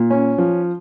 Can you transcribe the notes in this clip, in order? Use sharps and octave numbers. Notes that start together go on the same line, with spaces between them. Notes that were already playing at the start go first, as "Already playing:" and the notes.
Already playing: A#2
C#4
F3